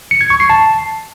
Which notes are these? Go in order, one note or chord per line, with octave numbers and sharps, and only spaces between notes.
C#7
G#6
C#6
C7
A5